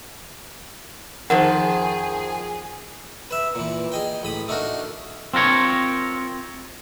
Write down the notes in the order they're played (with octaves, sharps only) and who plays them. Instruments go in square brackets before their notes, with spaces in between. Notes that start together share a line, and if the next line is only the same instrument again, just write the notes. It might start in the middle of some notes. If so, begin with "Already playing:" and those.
[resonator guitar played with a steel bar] F2 D#3 F3 [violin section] G#4 [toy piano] A#4 C5 [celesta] F#5
[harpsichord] B4 E5
A#2 E3
G#4 D#5 G5
A1 B5 D#6
A3 D4 D#4 F#4 A#4
[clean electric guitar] C4 F4 A#4 C#5